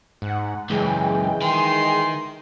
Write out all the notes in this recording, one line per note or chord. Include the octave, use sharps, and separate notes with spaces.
G#2 F#5
C#2 F#2 E3 G#3 G#4 G5
D#3 C6